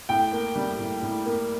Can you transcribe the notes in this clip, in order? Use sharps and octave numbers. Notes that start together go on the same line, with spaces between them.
A2 G5
A#3
G3
A2
A2
A#3